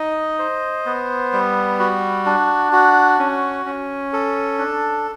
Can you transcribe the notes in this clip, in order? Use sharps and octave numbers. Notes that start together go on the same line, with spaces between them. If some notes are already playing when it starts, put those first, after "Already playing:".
Already playing: D#4 D#5
C5
B3
G3
F#4
D4
F#4
C#4
C#4
A4
D4